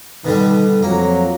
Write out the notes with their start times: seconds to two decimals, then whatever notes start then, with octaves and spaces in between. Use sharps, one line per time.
0.25 B2 D3 D#3 G3
0.83 F2 F#3 A#3